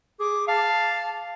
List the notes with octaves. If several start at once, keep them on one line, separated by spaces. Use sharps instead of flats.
G#4 D6
F5 A5